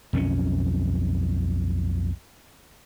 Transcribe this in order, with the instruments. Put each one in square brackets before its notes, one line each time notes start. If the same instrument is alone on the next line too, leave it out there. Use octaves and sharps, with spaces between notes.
[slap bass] B1 F2 E3 C#4